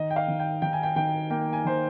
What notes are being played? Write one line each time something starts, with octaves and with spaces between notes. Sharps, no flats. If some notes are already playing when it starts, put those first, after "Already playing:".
Already playing: D#3 D#5
G5
F5
D#3
G5
D#3 G5
G#5
G5
D#3 G5
A#3 G5
G#5
D#3 C5